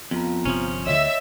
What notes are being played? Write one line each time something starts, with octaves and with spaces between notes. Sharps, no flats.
F2 B3 F4 A#5
G1 C3 F3 C4 C#4
D2 D3 C#5 D#5 E5 E6